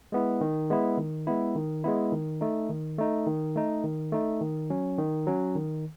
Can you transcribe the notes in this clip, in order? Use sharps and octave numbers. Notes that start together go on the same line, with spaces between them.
G#3 B3 E4
D#3
G#3 B3 E4
D#3
G#3 B3 E4
D#3
G#3 B3 E4
D#3
A3 D#4
D#3
A3 D#4
D#3
A3 D#4
D#3
A3 D#4
D#3
F#3 C#4
D#3
F#3 C#4
D#3